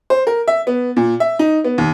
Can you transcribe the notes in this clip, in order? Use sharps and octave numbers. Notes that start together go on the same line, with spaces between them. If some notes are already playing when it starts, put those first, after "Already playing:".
C5
A#4
E5
B3
A#2
E5
D#4
B3
D#2